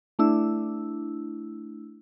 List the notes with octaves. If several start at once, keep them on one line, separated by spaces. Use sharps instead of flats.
A3 D4 E4 E6